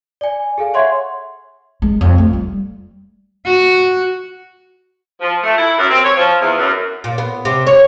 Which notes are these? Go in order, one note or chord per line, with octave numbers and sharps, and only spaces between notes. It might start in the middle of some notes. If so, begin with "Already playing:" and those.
D5 G#5
G#4 A4 F5 G#5
C#5 E5 F#5 C6 C#6 G#6
G#3
F2
A3
G3
F#4
F3
A3
E4
F#2
C4
C#5
F3
E2
F#2
A#2
B3
C3
C#5